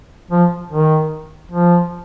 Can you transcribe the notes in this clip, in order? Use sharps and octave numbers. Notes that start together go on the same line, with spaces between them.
F3
D#3
F3